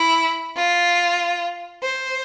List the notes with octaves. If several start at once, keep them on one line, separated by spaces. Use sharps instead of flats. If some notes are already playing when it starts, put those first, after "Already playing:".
Already playing: E4
F4
C5